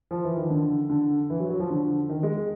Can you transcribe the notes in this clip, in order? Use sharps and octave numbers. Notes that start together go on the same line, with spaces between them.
F3
E3
D#3
D3
D3
E3
F#3
F#3
F3
D3
D#3
G#3